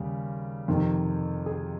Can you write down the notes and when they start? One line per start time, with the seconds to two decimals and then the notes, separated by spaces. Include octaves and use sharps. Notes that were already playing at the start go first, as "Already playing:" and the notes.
Already playing: D#2 C#3 G3
0.68 F2 C3 D#3
1.46 G#4